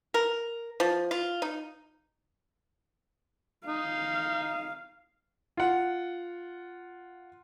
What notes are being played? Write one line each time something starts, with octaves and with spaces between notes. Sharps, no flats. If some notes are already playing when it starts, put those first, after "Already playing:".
A#4
F3
F4
D#4
D#4 F5
F4 F#5